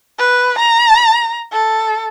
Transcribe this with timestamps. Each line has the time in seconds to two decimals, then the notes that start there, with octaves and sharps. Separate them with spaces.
0.18 B4
0.59 A#5
1.53 A4